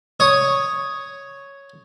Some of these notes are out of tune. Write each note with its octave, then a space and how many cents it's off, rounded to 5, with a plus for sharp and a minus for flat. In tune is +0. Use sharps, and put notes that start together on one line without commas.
C#5 +0 D#6 +0